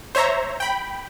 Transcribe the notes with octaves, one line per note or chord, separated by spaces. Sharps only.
C5 C#5 E5 A#5
G5 B5